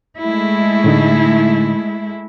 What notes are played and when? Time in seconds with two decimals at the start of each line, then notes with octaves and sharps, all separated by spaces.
0.19 G#3 A3 E4
0.84 A2 D3 D#4